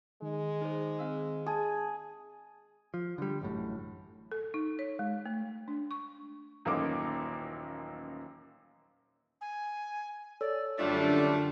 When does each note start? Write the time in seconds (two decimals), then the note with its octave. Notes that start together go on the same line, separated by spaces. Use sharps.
0.22 D#3 G#3
0.61 D#4 G#4 C5
0.99 C4 F5 E6
1.46 G#4 A5
2.94 F3
3.18 D3 G3
3.41 A1 F#2 A2
4.32 A4
4.54 D#4
4.79 C#5
4.99 G#3
5.26 A3
5.68 D4
5.91 C#6
6.65 D#1 A1 F#2 A#3 D#4 D6
9.41 G#5
10.41 A4 C#5 D5 E6
10.78 F#2 D3 G3 A3 D4 F4